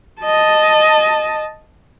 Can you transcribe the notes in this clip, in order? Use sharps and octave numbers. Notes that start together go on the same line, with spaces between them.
D#5 A5